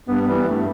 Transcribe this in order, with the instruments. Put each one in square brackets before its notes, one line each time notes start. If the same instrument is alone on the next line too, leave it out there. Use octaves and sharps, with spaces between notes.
[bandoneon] G2 [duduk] B3
[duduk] B3
[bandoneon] E3 G3
[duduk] B3
[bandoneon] G2 [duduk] A3